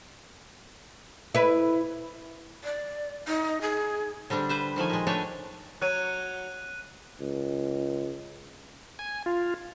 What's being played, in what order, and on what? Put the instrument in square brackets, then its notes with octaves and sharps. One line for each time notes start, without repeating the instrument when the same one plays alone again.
[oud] E4 B4
[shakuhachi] D5
D#4
G#4
[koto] D3 G3 C4 D4
B4 C5 E5
D#3 F3 A3 G#5
A#2 G#3
A3 D4 B4 C#5 G5 G#5
[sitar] F#3 C#5 [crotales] F#6 D#7
[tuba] C#2
[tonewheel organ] G#5
F4